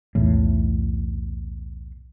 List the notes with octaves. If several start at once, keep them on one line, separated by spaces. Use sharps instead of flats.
B1 E2 A2